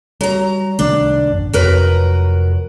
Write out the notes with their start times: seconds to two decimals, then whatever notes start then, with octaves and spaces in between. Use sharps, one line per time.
0.21 F#3 G3 A#5
0.79 C2 D#3 A3 D4
1.30 A1 F#2
1.53 F1 F2 F#3 A#4 B4